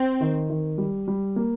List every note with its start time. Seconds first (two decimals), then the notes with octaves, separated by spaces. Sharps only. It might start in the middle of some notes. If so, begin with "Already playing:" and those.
Already playing: C4
0.21 D#3
0.50 D#3
0.78 G3
1.08 G3
1.36 A#3